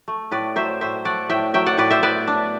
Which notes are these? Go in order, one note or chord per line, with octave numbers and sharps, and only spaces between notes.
A3
A2 B4 D5
F#3 C5 E5
A2 C5 E5
A3 D5 F#5
A2 E5 G5
F#3 E5 G5
D5 F#5
A2 B4 D5
C5 E5
B3 B4 D5
D4